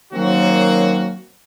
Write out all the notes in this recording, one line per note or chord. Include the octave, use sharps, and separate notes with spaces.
D#3 F#3 A#3 C4 C#4 F#4